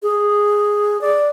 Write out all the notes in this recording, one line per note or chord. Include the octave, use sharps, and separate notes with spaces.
G#4
D5